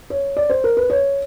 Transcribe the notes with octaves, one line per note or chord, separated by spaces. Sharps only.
C#5
D5
C5
A#4
B4
C#5